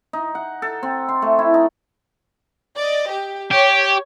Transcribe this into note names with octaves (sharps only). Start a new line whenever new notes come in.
D#4
F#5
A4
C4
C6
A3
E4
D#4
D5 D#5
G4
G4 C#5